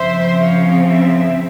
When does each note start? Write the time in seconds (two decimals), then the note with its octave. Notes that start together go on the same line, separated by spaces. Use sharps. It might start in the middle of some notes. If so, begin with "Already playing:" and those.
Already playing: C#3 F3 C4 C5 E5
0.40 C#5 F5
0.89 C5 E5